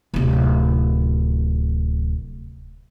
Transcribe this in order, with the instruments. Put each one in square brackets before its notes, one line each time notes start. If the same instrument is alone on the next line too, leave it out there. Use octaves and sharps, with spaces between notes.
[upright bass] D1 C3